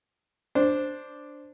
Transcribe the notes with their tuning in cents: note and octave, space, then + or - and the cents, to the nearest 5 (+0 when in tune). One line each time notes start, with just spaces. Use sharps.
D4 +0 C5 +0